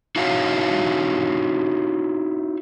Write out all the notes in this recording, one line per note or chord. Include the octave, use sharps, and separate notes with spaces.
D#4 E4 F#4 C#5 E5 F5